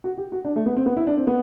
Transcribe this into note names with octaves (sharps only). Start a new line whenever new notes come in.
F#4
G4
F#4
D4
A3
B3
C4
B3
E4
D4
C4
B3